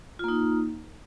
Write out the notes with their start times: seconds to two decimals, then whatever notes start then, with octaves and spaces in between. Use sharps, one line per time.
0.19 F4
0.24 A#3
0.28 D#4